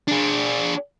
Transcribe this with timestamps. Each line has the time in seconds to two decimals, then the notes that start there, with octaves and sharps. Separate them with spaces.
0.08 D4 G#4